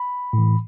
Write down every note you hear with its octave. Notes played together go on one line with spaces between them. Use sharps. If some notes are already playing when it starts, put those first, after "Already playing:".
Already playing: B5
A2
E3